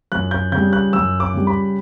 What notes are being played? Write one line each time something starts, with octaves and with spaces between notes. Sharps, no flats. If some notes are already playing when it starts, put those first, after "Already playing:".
F#2 F#6
G6
C#3 G6
G3
F#6
F#2 E6
D6
C#3 G3
B5